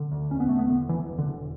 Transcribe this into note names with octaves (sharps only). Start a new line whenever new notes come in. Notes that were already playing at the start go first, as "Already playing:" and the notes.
Already playing: D3
D2
E1 C#4
B3
E1 A3
B3
D3
D2 E3
E1
D3
E1